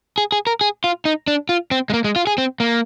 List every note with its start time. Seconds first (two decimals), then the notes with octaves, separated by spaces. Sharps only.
0.18 G#4
0.32 G#4
0.47 A#4
0.61 G#4
0.84 F4
1.05 D#4
1.28 D4
1.49 F4
1.71 C4
1.90 G#3
1.94 A#3
2.04 G#3
2.16 F4
2.27 G#4
2.38 C4
2.60 A#3